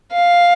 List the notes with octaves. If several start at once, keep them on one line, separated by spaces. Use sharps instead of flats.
F5